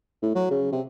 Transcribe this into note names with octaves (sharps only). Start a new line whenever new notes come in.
A2
F#3
C#3
C3